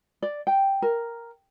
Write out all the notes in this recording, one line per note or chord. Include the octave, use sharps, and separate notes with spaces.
D5
G5
A#4